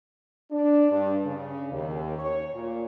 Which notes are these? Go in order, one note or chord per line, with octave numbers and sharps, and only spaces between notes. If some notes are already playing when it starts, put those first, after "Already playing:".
D4
G2
C#3
D#2
C#5
A#2